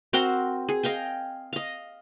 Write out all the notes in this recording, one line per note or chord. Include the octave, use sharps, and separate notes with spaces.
C4 F#4 A#4 C6
G#4
D#5 F5 G5 G#5
D#5 F5